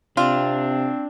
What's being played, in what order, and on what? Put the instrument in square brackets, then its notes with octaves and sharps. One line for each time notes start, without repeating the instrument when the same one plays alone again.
[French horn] C3 [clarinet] C4 [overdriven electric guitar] D4 [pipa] F4